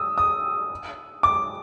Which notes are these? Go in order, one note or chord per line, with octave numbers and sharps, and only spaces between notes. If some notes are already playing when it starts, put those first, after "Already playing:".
Already playing: D#6 E6
D#6
D6